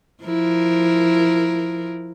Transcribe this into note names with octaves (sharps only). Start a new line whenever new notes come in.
F3 E4 A#4